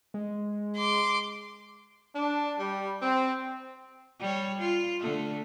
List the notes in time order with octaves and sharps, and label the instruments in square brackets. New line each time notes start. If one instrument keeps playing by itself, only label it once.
[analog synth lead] G#3
[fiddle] C6 D6
[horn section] D4
G3
C4
[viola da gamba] G3 C#5
F4
D3 A3